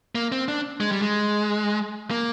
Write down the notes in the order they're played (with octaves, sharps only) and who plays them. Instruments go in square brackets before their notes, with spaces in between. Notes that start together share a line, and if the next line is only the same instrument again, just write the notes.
[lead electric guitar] A#3
C4
D4
G#3
G3
G#3
A#3